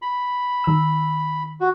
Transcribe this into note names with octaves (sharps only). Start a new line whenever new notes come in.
B5
D#3 E6
F#4